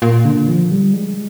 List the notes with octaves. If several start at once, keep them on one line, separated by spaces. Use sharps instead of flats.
A#2
D3
F3
G3
G#3